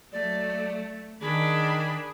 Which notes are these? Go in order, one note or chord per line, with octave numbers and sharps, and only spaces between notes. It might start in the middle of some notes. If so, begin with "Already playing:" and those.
F#3 A3 D5
D#3 D4 G#4 B5